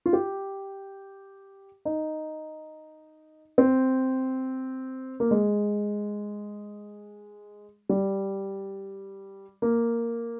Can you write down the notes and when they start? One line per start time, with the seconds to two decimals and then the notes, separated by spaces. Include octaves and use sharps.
0.06 F4
0.13 G4
1.85 D#4
3.58 C4
5.20 A#3
5.31 G#3
7.89 G3
9.62 A#3